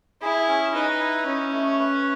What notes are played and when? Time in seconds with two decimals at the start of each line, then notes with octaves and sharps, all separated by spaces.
0.22 E4 G#4
0.48 C#4
0.75 D#4 B4
1.00 E4
1.26 C#4 D#4
1.52 A3
1.79 B4